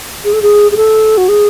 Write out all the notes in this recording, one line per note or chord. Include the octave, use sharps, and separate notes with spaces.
G#4
A4
G#4
G#4
A4
F#4
G#4